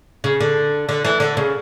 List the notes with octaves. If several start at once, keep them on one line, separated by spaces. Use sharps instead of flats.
C#3
D3
D3
E3
D3
C#3